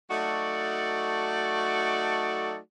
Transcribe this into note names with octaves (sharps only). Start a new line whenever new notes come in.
F#3 A3 D#4 F#4 A4 D5